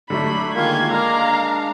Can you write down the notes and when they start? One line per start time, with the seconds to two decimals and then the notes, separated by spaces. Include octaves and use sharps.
0.10 D3 F#3 A3 D5 B5
0.55 D#3 G#3 A#3 F4 G#6
0.91 G#3 A#3 D4 F5 A#5 F6